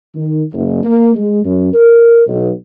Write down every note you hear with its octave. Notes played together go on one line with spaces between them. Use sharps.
D#3
F#1
A#3
G#3
F#2
A#4
B1